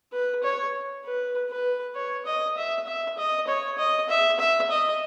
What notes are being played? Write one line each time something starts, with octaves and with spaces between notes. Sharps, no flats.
B4
C#5
B4
B4
C#5
D#5
E5
E5
D#5
C#5
D#5
E5
E5
D#5